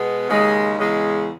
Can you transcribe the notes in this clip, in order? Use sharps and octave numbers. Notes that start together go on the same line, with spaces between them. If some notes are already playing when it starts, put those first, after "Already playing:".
Already playing: B2 G#3 B3
D#2 C#3 G#3
E2 C#3 G#3